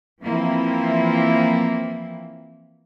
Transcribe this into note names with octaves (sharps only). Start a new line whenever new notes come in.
E3 F3 A#3 C4 E4